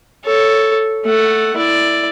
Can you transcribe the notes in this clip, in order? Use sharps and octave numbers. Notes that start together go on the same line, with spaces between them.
A4 C#5
A3 F#5
E4 D5